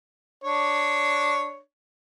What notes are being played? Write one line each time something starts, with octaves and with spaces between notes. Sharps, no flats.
D4 C#5